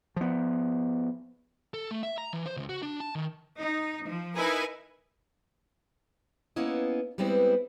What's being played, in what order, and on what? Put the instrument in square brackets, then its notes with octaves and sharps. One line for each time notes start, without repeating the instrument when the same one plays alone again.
[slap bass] F3 B3
[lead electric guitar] A4
A3
E5
A#5
E3
C5
C#2
F#4
D4
A5
D#3
[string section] D#4
F3
D#4 E4 A#4 B4 G#5
[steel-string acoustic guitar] A#3 B3 C#4 E4 D#5
G3 G#3 B3 C4 E4 B4